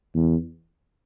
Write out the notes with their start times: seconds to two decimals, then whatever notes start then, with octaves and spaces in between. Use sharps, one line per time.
0.15 E2